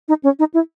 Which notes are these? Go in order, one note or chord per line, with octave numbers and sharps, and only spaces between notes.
D#4
C#4
D#4
E4